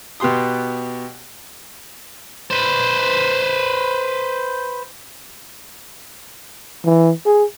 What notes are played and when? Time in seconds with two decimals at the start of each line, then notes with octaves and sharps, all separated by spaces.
0.20 B2 B3 G4 C6 D#6
2.51 B4 C5
6.85 E3
7.25 G#4